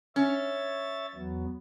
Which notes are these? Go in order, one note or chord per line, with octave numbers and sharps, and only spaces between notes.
C#4 C#5 E5 A6
E2 F#3 B3